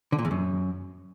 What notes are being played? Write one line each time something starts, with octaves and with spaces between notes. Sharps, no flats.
D3
A#2
E2
F#2